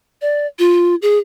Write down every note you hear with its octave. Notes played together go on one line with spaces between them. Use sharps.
D5
F4
G#4